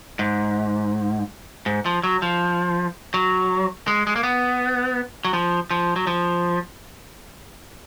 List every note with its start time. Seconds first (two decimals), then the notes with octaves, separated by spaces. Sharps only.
0.19 G#2
1.66 G#2
1.86 F3
2.03 F#3
2.22 F3
3.14 F#3
3.88 G#3
4.07 G#3
4.16 A#3
4.23 B3
5.25 F#3
5.33 F3
5.71 F3
5.96 F#3
6.07 F3